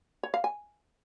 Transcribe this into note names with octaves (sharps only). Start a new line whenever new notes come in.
C#5
F5
G#5